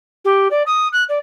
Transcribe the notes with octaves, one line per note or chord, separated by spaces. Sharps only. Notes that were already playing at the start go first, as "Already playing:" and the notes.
G4
D5
D#6
F#6
D5